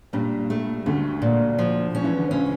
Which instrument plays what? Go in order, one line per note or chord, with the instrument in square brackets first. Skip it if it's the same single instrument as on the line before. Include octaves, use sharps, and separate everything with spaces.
[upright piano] G2 G3 [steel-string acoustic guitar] A#2
[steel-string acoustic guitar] A3
[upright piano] D2 D3 [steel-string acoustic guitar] A3
[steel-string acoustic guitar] A#2
F3
C#4
[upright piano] E3
D3
[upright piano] C#2 C#3 [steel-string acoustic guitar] C#4